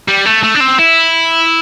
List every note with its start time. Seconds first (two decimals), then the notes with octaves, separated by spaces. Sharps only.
0.08 G3
0.25 A3
0.44 A3
0.55 D4
0.61 C4
0.79 E4